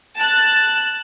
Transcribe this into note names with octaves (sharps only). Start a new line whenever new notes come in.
A5 F#6